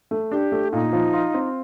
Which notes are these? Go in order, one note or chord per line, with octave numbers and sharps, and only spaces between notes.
A3
D4 G4
A3
A#2 D#4
F3
F4
C4